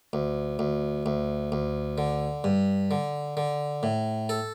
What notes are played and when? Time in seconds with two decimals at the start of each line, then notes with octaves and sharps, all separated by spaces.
0.13 D2
0.59 D2
1.06 D2
1.52 D2
1.98 D3
2.44 G2
2.91 D3
3.37 D3
3.83 A2
4.29 A4